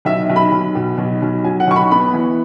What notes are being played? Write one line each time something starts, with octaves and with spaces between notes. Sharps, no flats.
B1 E5
B1
B5
B1
B2
B1
B1
F#3 G#5
F#5
B1 C#6
B5
B3 B5
E3